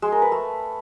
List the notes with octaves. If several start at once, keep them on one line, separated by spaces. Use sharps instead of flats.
G#3
A#4
B4
A3